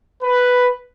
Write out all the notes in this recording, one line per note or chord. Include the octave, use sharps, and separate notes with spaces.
B4